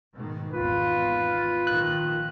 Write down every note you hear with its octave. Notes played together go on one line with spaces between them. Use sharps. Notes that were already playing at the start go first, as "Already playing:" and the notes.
G#2 B2 D#3
G#1 E2 F4 B4
A#1 D#3 F#6